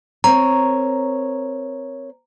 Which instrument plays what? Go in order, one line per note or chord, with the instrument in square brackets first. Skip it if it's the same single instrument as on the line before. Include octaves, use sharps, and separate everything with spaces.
[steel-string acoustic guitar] C4 A#4 C#5 [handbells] A#5